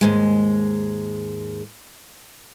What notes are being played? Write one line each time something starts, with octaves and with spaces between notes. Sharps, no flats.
D#2 G#2 G#3